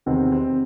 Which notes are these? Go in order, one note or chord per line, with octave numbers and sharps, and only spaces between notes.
E2 C3 D#3 C4
C4